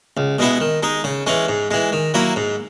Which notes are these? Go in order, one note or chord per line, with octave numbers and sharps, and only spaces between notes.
C#2
B2 G#3 B3 E4
D#3
G#3 D#4
C#3
E3 G#3 C#4
G#2
E3 G#3
D#3
F#3 A#3 E4
G#2